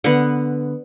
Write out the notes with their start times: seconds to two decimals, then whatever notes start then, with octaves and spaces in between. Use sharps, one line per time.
0.04 D3 B3 F#5